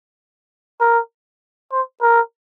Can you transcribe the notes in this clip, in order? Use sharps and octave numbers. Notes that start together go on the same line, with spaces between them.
A#4
C5
A#4